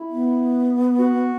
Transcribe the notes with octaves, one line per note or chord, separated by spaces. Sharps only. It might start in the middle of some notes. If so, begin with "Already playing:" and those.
Already playing: E4
B3
F#4